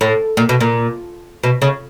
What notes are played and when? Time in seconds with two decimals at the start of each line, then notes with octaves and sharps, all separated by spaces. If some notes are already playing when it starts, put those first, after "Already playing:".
0.01 A2
0.37 A#2
0.49 B2
0.61 A#2
1.43 B2
1.62 C#3